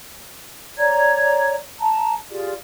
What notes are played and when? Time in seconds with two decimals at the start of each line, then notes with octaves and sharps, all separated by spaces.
0.77 C#5 D5 A#5 G#6
1.80 A5 A#5
2.30 F4 G4 G#4 D5